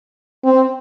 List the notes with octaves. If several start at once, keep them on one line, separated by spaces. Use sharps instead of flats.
C4